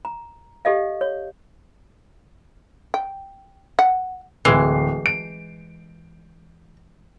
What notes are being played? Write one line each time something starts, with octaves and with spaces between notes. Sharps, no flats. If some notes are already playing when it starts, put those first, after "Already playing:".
A#5
G4 A4 D#5 F5
C#5
G5
F#5
D1 E3 G#3 C7
D7